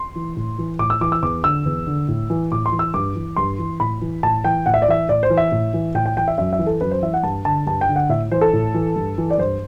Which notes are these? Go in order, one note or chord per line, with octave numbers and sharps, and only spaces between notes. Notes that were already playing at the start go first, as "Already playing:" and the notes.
Already playing: C6
E3
A2
E3
A2 D6
E6
E3 D6
E6
E2 D6
D3 E6
E2
D3
A2
E3
A2 D6
C6
E3
E6
G2 D6
E3
G2 C6
E3
A2 B5
E3
A2 A5
E3 G5
A2 F#5
E5
D5
E3 E5
A2 D5
C5
E3
E5
A2
E3
A2 G5
G5
E3 G5
E5
F#2 E5
E5
E3
A4
F#2 B4
C5
E3 E5
F#5
G2 A5
D3 A5
G2 A5
G5
D3
F#5
A2 E5
E3 C5
A4
A2
E3
G2
E3
D5
G2 C5